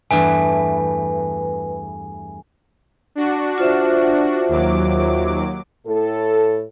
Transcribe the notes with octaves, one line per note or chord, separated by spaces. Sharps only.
E2 G2 A3 B4 G#5
D4 F#4
F4 C5 E5
D#2 F#3 D6
A2 A4